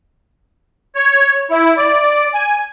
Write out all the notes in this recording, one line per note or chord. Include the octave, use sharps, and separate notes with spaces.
C#5
E4
D5
G#5